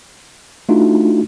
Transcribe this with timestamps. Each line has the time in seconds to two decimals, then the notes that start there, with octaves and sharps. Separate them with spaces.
0.69 A3 D4 D#4 F4 F#4